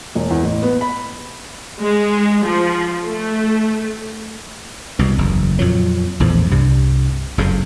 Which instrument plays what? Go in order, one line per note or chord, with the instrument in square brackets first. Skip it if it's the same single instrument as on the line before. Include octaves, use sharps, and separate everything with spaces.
[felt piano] E1
E2
A1
B3
B5
[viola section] G#3
F3
A3
[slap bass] C2 B2
F#1 E2
F2 A#2 F#3
A#1 E2 A2 F3
C2 G2 C3
F#1 F2 C#3